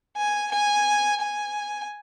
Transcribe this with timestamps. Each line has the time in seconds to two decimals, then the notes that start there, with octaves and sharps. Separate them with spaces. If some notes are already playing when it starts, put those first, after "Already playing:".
0.17 G#5
0.52 G#5
1.21 G#5